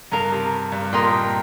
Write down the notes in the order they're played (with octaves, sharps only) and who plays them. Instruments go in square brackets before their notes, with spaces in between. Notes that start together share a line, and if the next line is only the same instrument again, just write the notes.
[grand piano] G2 [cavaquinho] D#4 A#4 F5
[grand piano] C3
G2
[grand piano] A#2 [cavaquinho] A#4 D#5 G5 C6
[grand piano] A#2